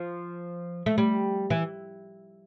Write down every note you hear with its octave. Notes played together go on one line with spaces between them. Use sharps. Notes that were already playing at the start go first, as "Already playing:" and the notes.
Already playing: F3
A3
G3
E3